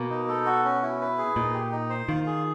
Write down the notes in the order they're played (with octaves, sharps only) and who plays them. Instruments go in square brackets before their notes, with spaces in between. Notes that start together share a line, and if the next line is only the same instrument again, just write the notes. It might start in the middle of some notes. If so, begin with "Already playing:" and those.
Already playing: [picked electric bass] B2 [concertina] A#3
[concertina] D#4
A4
F#4
C#4
E4
B4
G#4
[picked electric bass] A#2 [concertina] D#4
[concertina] G4
D#4
C5
[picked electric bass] D#3 [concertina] F4
[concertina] G#4